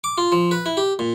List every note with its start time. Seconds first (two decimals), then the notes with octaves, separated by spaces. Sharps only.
0.04 D6
0.18 F4
0.32 F3
0.51 B4
0.66 E4
0.77 G4
0.99 A#2